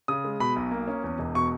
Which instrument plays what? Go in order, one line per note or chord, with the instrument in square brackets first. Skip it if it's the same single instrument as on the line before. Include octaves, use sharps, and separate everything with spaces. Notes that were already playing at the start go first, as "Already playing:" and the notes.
[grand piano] C#3 D#6
G#3
B2 B5
B1
A#3
C#4
E2
E1
B2 C#6